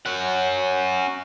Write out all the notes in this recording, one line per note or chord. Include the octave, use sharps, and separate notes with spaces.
C#4 F#5